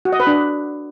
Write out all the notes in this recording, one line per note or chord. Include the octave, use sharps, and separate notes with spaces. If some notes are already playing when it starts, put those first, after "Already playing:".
F#4
D#5
B4
D4